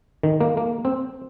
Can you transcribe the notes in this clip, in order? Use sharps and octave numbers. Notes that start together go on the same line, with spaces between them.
D#3
A#3
A#3
C4